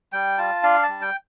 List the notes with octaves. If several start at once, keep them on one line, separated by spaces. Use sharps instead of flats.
G3 G5
F4 A5
D4 F5
A5
G3
G5